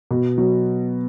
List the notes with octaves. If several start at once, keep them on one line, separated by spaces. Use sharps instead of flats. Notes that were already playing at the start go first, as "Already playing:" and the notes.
B2
F#3